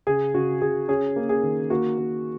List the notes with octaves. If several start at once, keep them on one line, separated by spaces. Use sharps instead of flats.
C#3 G#4
C#3 F#4
C#3 G#4
C#4 G#4
A#3
G#4
D#3
A#3 F#4
A#3